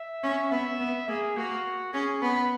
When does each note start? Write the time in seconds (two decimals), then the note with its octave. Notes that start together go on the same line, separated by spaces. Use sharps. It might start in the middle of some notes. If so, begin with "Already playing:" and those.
Already playing: E5
0.23 C#4
0.51 B3 E5
0.80 B3
1.08 A#3 G#4
1.37 A#3 F#4
1.93 C#4 G#4
2.22 B3 B4